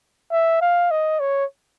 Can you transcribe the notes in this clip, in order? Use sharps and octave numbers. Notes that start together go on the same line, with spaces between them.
E5
F5
D#5
C#5